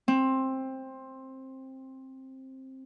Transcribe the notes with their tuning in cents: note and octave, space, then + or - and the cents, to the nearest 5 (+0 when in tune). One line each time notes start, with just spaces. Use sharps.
C4 +15